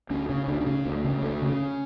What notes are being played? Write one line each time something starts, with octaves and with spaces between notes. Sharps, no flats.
D2 C#4
C#3 C#4
D2 D4
D4
C#3 C#4
D2
A3
C#3
D2 A3
C#3
C#4